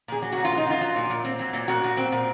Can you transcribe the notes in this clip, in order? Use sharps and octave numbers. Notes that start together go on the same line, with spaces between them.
A#2 G#4
F#3
A#2 F#4
F4
F#3
D#4
F#3 F4
F#3
A#2
A#2
C4
F#3
A#2
A#2 F#4
A#2
C4
A#2